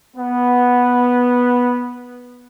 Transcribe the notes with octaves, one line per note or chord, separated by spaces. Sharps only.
B3